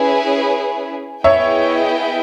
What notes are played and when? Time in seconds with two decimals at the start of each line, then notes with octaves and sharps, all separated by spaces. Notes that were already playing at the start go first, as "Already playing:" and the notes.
Already playing: C#4 E4 G#4 B4
1.24 B3 E4 G#4 C#5 D#5 E5 G5